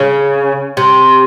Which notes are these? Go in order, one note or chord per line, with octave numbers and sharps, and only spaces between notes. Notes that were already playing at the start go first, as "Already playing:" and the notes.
Already playing: C#3
C3